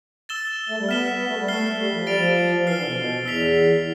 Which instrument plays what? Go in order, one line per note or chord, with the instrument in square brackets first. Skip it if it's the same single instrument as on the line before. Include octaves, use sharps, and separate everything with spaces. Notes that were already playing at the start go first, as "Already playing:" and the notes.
[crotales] E6 A6 E7 G7
[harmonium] A3
G3
[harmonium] B3 [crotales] F6 B6 E7 G7
[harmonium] B3
A3
G3
[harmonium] A3 [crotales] F6 C7 G7
[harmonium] A3
G3
F3
[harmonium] G3 [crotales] A6 D7 F7
[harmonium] F3
[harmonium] E3 [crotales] F6 C7 G7
[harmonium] D3
B2
B2
[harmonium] E2 [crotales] E6 B6 F7